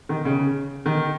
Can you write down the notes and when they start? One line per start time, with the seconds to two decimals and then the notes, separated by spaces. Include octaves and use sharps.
0.09 D#3
0.25 C#3
0.86 D#3